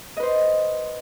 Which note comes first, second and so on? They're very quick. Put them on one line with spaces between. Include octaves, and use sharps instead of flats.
D#5 B4 C5